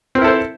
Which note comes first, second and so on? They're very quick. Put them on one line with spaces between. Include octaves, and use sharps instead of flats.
C4 A#4 E4 A4 C5